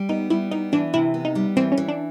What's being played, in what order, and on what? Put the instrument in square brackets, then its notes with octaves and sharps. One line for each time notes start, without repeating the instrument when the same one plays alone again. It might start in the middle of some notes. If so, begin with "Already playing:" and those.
Already playing: [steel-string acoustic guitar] G3
[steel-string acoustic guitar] B3 [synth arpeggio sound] D#4
[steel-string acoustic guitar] G3 [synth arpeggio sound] E4
[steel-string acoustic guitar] B3 [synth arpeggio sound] D#4
[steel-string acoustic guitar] E3 [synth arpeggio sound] D4
[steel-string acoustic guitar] C3 [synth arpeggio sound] E4
[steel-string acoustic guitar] B3
[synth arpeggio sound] D#4
[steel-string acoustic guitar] G3
[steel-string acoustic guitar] E3 [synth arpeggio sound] C4
[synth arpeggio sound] C#4
[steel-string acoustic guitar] E3
[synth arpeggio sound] D4